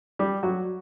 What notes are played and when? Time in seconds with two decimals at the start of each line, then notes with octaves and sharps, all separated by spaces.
0.19 G3 G4
0.43 F#3 F#4